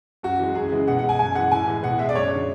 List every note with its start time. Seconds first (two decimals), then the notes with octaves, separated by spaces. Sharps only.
0.23 F#2 F#4
0.39 E3 G#3
0.55 F#2 G#4
0.71 C#3 E3 G#3
0.87 B2 F#5
0.99 G#3 F#5
1.09 G#5
1.19 F#2 G#5
1.35 E3 G#3 F#5
1.51 A2 G#5
1.68 E3 G#3
1.83 B2 F#5
1.99 G#3 E5
2.09 D5
2.15 F#2 C#5
2.31 D3 G#3